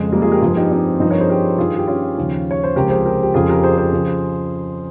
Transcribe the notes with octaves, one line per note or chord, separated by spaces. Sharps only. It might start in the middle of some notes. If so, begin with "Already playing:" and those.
Already playing: F2 C#3 F3 G#3
G3 A#3
F4 G#4
G4 A#4
G2 F3 F4 G#4
D#4 G4
C4 D#4
G2 F3 C4 D#4
A#4 C#5
G#4 C5
G4 A#4
G2 D#3 F4 G#4
G4
C#4 F4
D#2 C#3 F3
C#5
C5
C#2 C3 F3 G4 A#4
G#4 C5
G4 A#4
G4
F2 C#3 F3 F4 G#4
G4 A#4
G#4 C5
G#4 C5
C#3 F3